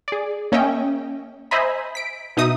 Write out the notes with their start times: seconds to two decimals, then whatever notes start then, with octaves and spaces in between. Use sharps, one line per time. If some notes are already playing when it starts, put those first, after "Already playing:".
0.08 G#4 D5
0.52 A#3 C#4 D#5 E5 G5
1.51 C5 D#5 E5 G#5 A#5 B5
1.95 B6 D7
2.37 B2 D#4 E5 D#6